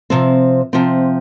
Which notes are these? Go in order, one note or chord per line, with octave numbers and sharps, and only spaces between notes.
C3 F3 C4
C3 F3 C4